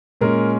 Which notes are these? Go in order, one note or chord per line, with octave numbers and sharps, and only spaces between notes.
A#2 G#3 C#4 A#4